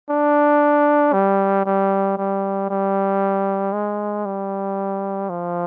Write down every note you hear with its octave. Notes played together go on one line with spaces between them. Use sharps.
D4
G3
G3
G3
G3
G#3
G3
F3